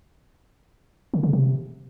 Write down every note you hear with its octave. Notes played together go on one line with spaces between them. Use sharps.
D3
C#3
C3